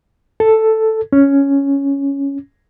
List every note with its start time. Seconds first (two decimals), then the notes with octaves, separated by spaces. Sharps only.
0.40 A4
1.13 C#4